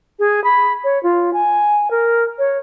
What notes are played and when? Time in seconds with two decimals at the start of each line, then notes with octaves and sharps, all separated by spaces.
0.19 G#4
0.44 B5
0.84 C#5
1.03 F4
1.33 G#5
1.91 A#4
2.38 C#5